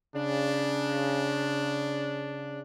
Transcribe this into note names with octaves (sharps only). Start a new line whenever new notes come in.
C#3 D4